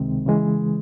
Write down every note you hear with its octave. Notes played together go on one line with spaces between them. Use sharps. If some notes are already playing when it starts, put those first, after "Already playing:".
Already playing: C#2 C3 D#3 G#3 C4
C#3 E3 G#3